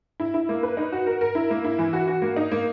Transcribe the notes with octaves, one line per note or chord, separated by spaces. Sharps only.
E4
E4
A#3
B4
D#4
F#4
A#4
A#4
E4
A#3
E4
E3
F#4
F#4
A#3
D#4
A#3